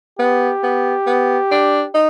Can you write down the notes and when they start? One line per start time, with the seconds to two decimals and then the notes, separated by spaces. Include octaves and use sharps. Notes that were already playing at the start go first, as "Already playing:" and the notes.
0.19 B3 G4
0.63 B3
1.06 B3
1.51 D4
1.95 D#4